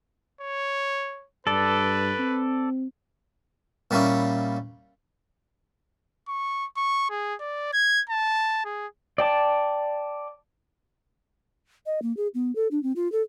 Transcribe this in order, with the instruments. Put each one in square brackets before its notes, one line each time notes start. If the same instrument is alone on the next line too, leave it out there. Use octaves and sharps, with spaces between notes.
[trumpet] C#5
[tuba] G2 [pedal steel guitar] A4 D5 [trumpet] B4
[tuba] C4
[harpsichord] A#2 G3 A#3 C#4 E4
[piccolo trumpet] C#6
C#6
G#4
D5
G#6
A5
G#4
[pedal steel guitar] D5 G5 A5
[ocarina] D#5
A#3
G#4
B3
A4
D4
C4
F4
A4